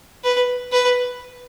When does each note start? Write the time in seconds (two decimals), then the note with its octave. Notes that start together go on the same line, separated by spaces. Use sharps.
0.24 B4
0.72 B4